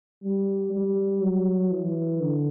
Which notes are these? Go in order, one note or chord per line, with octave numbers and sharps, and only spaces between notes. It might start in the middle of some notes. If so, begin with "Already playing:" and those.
G3
G3
F#3
E3
D3